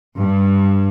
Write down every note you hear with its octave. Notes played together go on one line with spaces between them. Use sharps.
G2